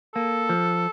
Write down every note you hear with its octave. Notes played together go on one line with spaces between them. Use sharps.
A#3 A4
F3